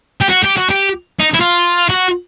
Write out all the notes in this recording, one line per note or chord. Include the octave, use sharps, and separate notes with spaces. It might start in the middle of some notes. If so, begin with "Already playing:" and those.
G4
F#4
G4
F#4
G4
D#4
E4
F4
F#4